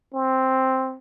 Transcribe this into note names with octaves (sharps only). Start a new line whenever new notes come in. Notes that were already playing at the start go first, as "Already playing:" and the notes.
C4